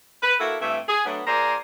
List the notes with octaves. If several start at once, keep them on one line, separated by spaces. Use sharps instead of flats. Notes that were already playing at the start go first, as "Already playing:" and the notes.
B4
A#3 E4 F#4 A4
G2 E3 A3 C4 E5
G#4
F#3 A3 B3 D4
A#2 G#4 A#4 C5 D5